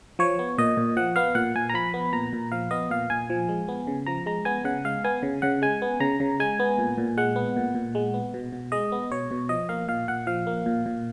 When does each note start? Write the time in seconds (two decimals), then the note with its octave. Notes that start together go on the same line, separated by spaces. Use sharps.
0.19 F3 C#5
0.39 B3
0.58 A#2 D#5
0.77 A#2
0.97 F3 F#5
1.16 B3 F5
1.35 A#2 F#5
1.55 A#2 G#5
1.69 A#5
1.74 F3 B5
1.94 B3
2.13 A#2 A#5
2.33 A#2
2.52 F3 F5
2.71 B3 D#5
2.90 A#2 F5
3.10 A#2 G#5
3.30 F3
3.49 G#3
3.68 B3
3.87 C#3
4.06 F3 A#5
4.26 G#3 A#5
4.45 B3 G#5
4.65 C#3 F#5
4.85 G#3 F5
5.04 B3 G#5
5.23 C#3
5.42 C#3 F#5
5.62 G#3 G#5
5.82 B3
6.00 C#3 A#5
6.20 C#3
6.40 G#3 G#5
6.60 B3
6.78 A#2
6.98 A#2
7.17 G#3 F#5
7.36 B3
7.56 A#2
7.75 A#2
7.95 G#3
8.14 B3
8.34 B2
8.53 B2
8.72 G#3 D#5
8.92 B3
9.11 B2 C#5
9.31 B2
9.49 F3 D#5
9.69 A#3 F5
9.88 A#2 F5
10.08 A#2 F#5
10.27 F3 F5
10.47 A#3
10.66 A#2
10.86 A#2